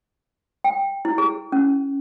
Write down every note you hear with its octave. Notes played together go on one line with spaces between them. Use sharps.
G5
E4
G#4
C#4